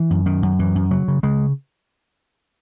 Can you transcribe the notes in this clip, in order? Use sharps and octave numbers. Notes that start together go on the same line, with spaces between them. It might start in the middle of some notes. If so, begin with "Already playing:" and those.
Already playing: E3
F#2
F#2 D#3
F#2
F#2 E3
F#2
C#3 F#3
C#3
C#3 G#3